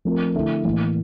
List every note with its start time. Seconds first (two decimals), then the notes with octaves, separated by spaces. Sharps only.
0.05 F3 A3 C4 F4 A#4
0.35 D3 A3 E4 A4 E5
0.65 A2 E3 A#3